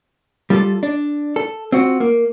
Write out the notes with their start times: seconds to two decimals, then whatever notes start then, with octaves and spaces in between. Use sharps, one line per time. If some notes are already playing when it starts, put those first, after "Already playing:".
0.50 G3 F4 G#4 A4
0.83 D4
1.36 A4
1.72 C4 F4 F#4
2.00 A#3